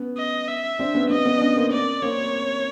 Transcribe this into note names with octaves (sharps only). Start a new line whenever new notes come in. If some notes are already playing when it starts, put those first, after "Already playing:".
Already playing: B3 C#4
D#5
E5
C4 D4
B3 C#4
B3 C#4 D#5
B3 C#4
D4
B3 C#4
A#3 C4
D5
A#3 C4 C#5